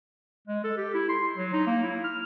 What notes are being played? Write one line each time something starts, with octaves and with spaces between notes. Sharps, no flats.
G#3
A4
G4
E4
C6
F#3
D#4
A#3
E4
F6